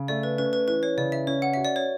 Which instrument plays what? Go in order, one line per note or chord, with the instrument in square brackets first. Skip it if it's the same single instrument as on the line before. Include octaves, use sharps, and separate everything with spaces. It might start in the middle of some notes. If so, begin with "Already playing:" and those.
Already playing: [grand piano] C#3
[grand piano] A3 [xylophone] D5
[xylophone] B4
[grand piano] C#4 [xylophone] B4
[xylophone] B4
[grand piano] E3 [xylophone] B4
[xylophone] C#5
[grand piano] C#3 [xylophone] D5
[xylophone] E5
[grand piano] C#4 [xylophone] C#5
[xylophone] F#5
[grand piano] F#4 [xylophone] E5
[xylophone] D5
C#5